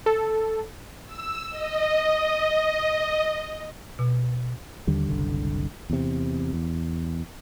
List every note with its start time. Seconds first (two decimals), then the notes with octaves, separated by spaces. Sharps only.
0.06 A4
1.06 E6
1.50 D#5
3.99 B2
4.87 D#2 D3 G3
5.09 F#1 C2 D3
5.90 E2 C3
6.53 E2